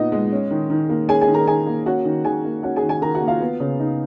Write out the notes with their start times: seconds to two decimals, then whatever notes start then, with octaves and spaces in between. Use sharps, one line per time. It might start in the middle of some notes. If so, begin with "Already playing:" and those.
Already playing: A#2 B3 D#4 D#5 F#5
0.12 G#3
0.32 C#4
0.51 D#3
0.70 D#3
0.90 A#3
1.09 C#4 G#4 G#5
1.21 G#4 G#5
1.28 D#3
1.34 A#4 A#5
1.47 D#3 G#4 G#5
1.67 A#3
1.86 C#4 F#4 F#5
2.05 D#3
2.24 D#3 G#4 G#5
2.44 A#3
2.63 C#4 F#4 F#5
2.76 G#4 G#5
2.83 D#3
2.89 G#4 G#5
3.01 D#3 A#4 A#5
3.15 F#4 F#5
3.21 A#3
3.27 F4 F5
3.40 B3
3.60 C#3
3.80 D#4